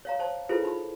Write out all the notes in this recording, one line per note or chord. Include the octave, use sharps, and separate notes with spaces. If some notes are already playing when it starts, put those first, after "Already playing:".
C#5 F5 A#5
C5 C#5 A5
E4 F4 G#4 A4 B4 C5
D#4 B5